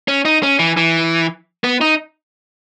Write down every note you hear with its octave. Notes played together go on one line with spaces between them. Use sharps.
C#4
D#4
C#4
E3
E3
B3
D#4